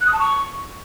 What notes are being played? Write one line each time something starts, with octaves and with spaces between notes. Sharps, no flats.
F#6
D#6
A5
C#6